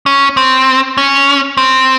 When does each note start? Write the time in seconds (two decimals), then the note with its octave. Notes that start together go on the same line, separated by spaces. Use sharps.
0.06 C#4
0.37 C4
0.97 C#4
1.57 C4